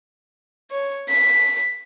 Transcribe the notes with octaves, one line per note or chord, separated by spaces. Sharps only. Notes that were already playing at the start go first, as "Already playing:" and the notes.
C#5
B6